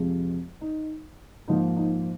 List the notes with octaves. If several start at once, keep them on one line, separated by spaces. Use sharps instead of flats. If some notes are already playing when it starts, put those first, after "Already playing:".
Already playing: F2 C3 F3 G#3
D#4
G#2 F3 A#3 D#4
D#4